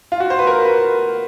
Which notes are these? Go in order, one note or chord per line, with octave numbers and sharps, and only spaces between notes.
F4
F#4
C5
B4
A#4
B4